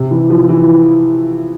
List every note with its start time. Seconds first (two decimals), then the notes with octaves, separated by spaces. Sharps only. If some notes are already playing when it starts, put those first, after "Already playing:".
Already playing: C3
0.11 E3
0.30 F3
0.49 E3